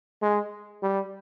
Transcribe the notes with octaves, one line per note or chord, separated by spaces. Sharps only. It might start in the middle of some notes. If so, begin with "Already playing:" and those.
G#3
G3